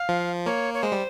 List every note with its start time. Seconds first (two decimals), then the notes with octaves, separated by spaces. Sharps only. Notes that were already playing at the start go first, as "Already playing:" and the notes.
Already playing: F5
0.09 F3
0.45 A#3 C#5
0.74 C#5
0.82 G#3 C5
0.92 G3